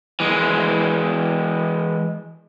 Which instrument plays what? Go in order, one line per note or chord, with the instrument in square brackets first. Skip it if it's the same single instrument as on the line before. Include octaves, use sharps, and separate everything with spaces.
[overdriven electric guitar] E3 G#3